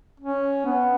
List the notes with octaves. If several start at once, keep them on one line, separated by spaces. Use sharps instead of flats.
C#4
B3